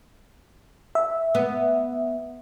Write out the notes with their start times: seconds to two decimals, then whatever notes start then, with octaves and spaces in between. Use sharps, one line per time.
0.95 E5
1.35 B3